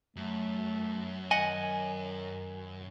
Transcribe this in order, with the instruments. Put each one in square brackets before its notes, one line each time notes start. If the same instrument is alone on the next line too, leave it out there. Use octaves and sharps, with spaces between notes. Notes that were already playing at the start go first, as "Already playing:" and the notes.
[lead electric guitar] F#2 [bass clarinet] A3
[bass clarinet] D#3 [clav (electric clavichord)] D#5 F#5 [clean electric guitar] G#5